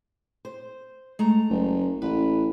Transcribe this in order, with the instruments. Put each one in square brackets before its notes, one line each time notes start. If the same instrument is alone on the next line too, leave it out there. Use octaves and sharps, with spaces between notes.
[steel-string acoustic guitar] C5
G#3 A3 A#5
[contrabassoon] F#1
[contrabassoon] A1 [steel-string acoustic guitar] B4